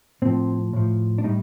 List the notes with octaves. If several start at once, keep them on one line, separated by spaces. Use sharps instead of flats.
A2 F3 C4
A2 F3
D4
A2 G3 D#4